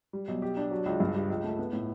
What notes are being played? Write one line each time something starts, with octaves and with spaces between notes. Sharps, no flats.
G3
B1
G4
D4
F#3
C#2
G2
G3
C#2
A3
B3
A2